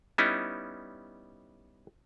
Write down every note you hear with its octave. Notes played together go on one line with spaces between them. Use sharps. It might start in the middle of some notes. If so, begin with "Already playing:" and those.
G3 B3 C#4 D#4 E4